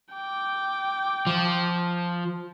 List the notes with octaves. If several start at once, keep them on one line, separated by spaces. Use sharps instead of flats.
G5 D6
F3